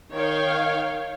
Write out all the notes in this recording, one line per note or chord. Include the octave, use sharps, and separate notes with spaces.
D#3 C#5 F5 G5